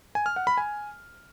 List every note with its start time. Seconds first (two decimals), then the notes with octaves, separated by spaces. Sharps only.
0.15 G#5
0.26 F6
0.36 F#5
0.47 B5
0.58 G#5